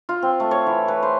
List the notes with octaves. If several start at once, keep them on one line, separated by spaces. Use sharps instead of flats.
F4
C4
A3
C#5
E3
B4
C5